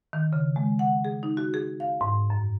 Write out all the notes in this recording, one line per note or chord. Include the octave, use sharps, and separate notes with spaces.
D#3
C#3
G#3
F#5
G#4
D#4
F#4
G#4
F5
G#2
F#2